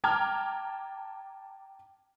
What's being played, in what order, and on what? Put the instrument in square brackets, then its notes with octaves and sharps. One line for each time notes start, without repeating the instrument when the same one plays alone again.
[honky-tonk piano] G5 A5 A#5 D6 F6 G#6